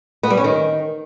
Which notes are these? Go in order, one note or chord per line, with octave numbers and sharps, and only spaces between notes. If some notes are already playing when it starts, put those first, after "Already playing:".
B3
G3
C#4
D#3